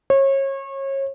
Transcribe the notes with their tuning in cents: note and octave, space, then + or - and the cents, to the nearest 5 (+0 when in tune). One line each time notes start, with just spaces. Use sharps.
C#5 -30